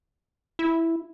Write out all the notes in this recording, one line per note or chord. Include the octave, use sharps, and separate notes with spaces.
E4